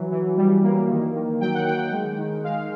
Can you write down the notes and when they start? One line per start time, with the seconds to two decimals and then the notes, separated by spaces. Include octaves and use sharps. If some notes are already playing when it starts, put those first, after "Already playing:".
Already playing: E3 F#3
0.12 E3
0.37 G3
0.63 A#3
0.89 D#3
1.15 D#3
1.40 F#3 G5
1.54 F#5
1.66 D#3 G5
1.92 G#3
2.18 D#3
2.44 G#3 F5